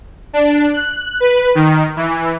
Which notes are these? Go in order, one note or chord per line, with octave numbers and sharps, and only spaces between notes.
D4
F#6
B4
D#3
E3